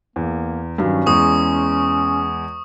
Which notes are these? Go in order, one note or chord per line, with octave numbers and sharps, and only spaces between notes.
E2 A#3
G2 D#3 F#3 C#4
E2 G#3 C#6 D#6